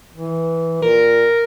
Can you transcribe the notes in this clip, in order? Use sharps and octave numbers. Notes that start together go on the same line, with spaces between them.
E3
A#2 A#4